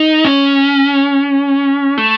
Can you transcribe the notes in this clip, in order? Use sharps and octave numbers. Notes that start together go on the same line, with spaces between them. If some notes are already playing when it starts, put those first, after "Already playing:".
Already playing: D#4
C#4
A3